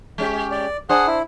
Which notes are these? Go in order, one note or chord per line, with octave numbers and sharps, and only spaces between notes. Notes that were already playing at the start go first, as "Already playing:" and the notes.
G#3 C#4 G4
D5
D4 G#4 C5 F#5
E4